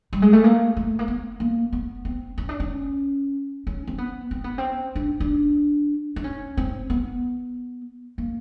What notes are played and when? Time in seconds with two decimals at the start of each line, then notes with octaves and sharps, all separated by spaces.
0.13 G3
0.22 G#3
0.33 A3
0.44 A#3
0.77 A3
0.99 A#3
1.08 B3
1.40 A#3
1.73 B3
2.05 C4
2.38 C#4
2.49 D4
2.60 C#4
3.67 C#4
3.87 C4
3.98 B3
4.31 C4
4.44 B3
4.58 C4
4.95 D4
5.20 D4
6.16 D4
6.24 C#4
6.57 C4
6.90 B3
8.18 A#3